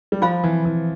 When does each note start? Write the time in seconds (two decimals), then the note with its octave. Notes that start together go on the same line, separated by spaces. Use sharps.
0.12 G3
0.22 F3 F4 C5 F5 B5
0.44 E3
0.65 E3